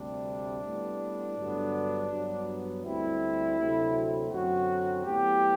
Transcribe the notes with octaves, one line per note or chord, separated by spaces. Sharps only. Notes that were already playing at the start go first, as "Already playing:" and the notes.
Already playing: D2 C3 G3 D4
A2 G3 B3
G2 D3 F#3 B3
G2 F#3 B3
D2 D3 G3 C4 E4
D2 C3 F#3 A3 C4
F#2 D3 F#3 C4 F#4
A2 F#3 B3 G4